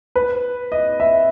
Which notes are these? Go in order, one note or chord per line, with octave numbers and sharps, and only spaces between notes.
B4
D#5
E5